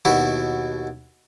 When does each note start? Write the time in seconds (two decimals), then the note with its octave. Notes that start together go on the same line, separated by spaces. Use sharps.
0.05 D#2 B2 E4 F#4